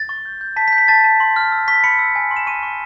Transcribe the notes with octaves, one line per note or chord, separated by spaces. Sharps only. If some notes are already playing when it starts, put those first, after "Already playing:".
Already playing: A6
C#6
G6
G6
A5 B6
B6
G6
B6
A5 A6
A5
C6
F6
E6
C#6 B6
B5 C#7
E6
G#5
C6
E7
C#6 D#7
C#6